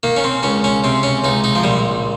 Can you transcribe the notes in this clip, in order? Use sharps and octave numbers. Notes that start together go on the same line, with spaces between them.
D#3 A#3
C#4
C4
C#2 C#4
C#4
C3 C4
C#4
C#2 D#4
D#4
F3
A#1 G3